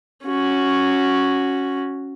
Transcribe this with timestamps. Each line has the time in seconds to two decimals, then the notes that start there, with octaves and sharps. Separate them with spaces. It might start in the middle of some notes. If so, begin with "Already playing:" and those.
0.25 C#4 F#4